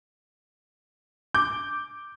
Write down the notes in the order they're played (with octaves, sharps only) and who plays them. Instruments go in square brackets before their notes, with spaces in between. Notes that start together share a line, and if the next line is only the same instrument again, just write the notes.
[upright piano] D6 G6